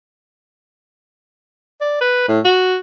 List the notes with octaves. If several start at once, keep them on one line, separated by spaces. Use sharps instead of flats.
D5
B4
A2
F#4